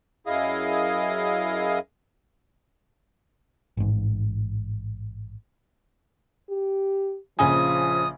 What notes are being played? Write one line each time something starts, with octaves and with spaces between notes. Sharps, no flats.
F#2 E4 G#4 D#5 F5 D#6
A1 G#2
G4
A#1 C#3 F3 G#5 D#6